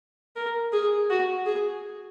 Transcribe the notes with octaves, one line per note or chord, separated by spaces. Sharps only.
A#4
G#4
F#4
G#4